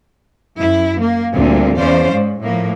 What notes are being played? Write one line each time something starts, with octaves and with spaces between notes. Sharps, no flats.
F#2 E4
A#3
D2 A#2 D3 G3 C4
E2 C#4 C5 D5 F5
G#2
A2 F3 A#3